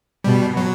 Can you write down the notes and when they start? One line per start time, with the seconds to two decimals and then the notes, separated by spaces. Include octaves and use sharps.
0.24 B2 G3
0.57 F#3